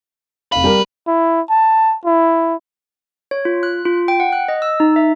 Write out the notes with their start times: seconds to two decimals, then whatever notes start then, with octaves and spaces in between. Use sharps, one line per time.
0.52 F1 B4 F5
0.64 G3 G4 A#4
1.07 E4
1.50 A5
2.05 E4
3.31 C#5
3.45 F4
3.63 F#6
3.85 F4
4.08 G5
4.20 F#5
4.32 F#6
4.48 D#5
4.62 E6
4.80 D#4
4.96 E5